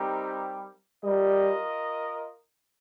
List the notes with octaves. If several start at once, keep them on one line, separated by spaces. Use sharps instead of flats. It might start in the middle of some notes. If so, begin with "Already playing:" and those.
Already playing: G3 C4 D#4 G4 A#4
G3 F4 A#4 D#5